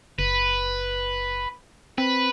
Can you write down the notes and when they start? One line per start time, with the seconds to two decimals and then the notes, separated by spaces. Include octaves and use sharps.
0.19 F#1 B4
1.98 C4 B4